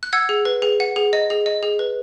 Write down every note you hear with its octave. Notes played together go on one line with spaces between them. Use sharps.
F#6
F#5 E6 G#6
G#4
B4
G#4
F#5
G#4
D#5
G#4
D#5
G#4
B4